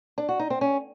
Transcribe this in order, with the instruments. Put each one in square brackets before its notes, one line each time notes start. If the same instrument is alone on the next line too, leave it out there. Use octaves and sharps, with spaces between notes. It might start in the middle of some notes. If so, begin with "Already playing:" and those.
[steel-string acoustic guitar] D4
F#4
D#4
C4
C#4